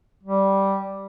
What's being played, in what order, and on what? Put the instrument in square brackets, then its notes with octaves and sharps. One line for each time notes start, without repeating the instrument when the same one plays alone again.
[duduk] G3